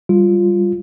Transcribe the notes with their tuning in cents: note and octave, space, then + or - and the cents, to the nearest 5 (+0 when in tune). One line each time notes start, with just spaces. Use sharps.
G3 +0 F4 +0